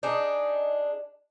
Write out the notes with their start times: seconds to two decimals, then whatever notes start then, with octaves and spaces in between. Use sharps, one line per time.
0.03 D4 D#4 G#4